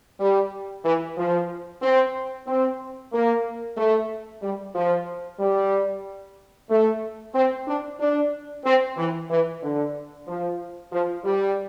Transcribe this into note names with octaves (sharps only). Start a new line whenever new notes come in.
G3
E3
F3
C4
C4
A#3
A3
G3
F3
G3
A3
C4
D4
D4
C4
E3
E3
D3
F3
F3
G3